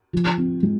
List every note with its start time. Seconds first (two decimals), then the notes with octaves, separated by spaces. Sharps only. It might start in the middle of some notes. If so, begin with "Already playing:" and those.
0.13 F3
0.38 C4
0.63 G#3